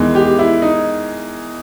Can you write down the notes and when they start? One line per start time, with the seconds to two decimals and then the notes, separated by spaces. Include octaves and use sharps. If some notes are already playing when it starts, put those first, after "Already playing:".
Already playing: E2 D#3 G#3
0.15 G4
0.39 E4
0.62 D#4